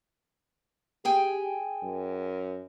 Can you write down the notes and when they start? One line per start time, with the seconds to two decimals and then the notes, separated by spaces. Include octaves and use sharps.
1.05 G4 G#4 G5 G#5
1.83 F#2